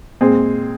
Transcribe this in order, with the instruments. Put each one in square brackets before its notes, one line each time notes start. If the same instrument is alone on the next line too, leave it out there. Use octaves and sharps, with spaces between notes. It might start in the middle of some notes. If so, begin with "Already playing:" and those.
[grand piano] A#2 G#3 C4 G#4